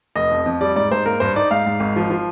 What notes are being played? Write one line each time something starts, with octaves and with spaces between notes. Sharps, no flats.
F1 D#5
F2
F2
G3 D5
G#2 D5
G#2 C5
A#3 A#4
G2 C5
D#4 D5
G#2 F5
G#2
G#1
F3
F3